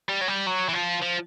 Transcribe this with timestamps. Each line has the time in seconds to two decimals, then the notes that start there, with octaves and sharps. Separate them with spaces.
0.09 G3
0.21 F#3
0.28 G3
0.47 F#3
0.69 E3
0.73 F3
1.02 F3